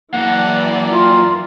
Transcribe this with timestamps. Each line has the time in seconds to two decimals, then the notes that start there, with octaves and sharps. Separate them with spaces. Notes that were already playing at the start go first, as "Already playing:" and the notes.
0.14 F#2 E3 A#3 D5 F#5
0.91 F4 A#4